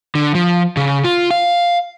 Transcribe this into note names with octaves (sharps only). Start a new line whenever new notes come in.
D3
F3
C#3
F4
F5